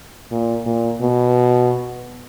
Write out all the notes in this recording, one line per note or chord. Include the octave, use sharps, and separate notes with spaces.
A#2
A#2
B2